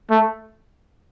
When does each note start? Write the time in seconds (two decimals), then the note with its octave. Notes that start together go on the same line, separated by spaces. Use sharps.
0.10 A3